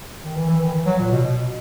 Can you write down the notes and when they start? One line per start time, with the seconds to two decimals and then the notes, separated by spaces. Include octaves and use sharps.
0.24 D#3
0.36 E3
0.49 E3
0.62 D#3
0.74 E3
0.86 F#3
0.99 A#2
1.12 B2
1.25 B2